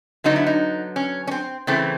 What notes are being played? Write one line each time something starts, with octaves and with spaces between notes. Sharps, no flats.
D3 F#3 B3 D#4
E4
D#4
C#4
C#4
C4
C#3 E3 A3 C4